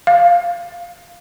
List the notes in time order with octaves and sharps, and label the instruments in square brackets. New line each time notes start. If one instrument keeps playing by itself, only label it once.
[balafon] F5